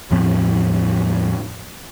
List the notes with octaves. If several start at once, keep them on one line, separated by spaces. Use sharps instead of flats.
E2 A2 F3 C4